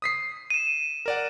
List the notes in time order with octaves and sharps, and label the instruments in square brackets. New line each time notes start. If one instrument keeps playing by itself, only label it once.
[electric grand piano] D#6 B6 C7
[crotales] D#7 E7
[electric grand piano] A#4 D5 F#5